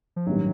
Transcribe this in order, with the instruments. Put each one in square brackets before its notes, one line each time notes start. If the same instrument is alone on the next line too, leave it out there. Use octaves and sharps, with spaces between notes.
[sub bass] F3
[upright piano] A1 G2 D#3 G3 [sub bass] F#3